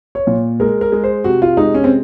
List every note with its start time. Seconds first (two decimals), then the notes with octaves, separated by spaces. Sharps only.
0.15 C#5
0.27 A#2
0.60 G#3 A#4
0.81 A#4
0.92 G#3
1.04 C5
1.24 C3 F#4
1.42 F4
1.57 G#3 D#4
1.74 C#4
1.84 C4